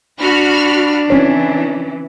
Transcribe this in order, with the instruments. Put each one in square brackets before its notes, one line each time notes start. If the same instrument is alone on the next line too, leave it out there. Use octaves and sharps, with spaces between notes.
[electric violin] D4 [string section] F#4 B5 F6
[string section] E3 [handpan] C4 C#4 C#5